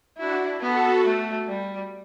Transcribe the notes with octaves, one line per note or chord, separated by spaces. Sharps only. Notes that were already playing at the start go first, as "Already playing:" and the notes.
D4 E4 F#4
B3 F#4 A4
A3
G3